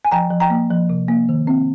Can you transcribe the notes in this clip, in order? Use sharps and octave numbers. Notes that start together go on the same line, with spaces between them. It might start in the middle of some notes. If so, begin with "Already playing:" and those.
G#5
F3 G5 A#5
F3
G5 A#5
A#3
F3
C3
A#3
D#3
C4